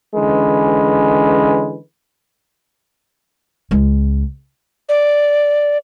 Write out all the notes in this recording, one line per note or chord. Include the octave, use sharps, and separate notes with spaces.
D3 E3 G#3 C#4 B4
C#2 G#3
D5